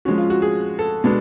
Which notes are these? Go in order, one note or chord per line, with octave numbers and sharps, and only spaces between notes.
F3 G#3 C#4 F#4
F4
F#4
G#4
A4
B2 G#3 B3 D4